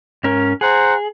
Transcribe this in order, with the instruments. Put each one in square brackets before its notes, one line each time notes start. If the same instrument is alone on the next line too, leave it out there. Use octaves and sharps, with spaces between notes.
[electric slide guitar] G#2 C#4 A#4
[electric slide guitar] G#4 [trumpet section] C5 F#5 A#5